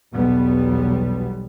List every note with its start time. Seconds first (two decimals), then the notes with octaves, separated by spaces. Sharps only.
0.14 B1 E2 B2 G3 B3